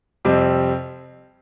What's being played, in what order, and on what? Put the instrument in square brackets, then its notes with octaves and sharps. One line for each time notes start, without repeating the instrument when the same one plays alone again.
[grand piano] F2 C3 G3 C4